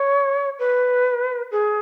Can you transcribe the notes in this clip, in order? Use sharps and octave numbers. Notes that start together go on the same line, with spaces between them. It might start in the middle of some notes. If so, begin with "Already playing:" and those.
Already playing: C#5
B4
G#4